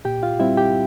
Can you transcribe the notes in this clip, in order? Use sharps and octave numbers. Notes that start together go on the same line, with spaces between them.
A#2 G4 G5
F4 F5
G3 C4 E4 E5
G4 G5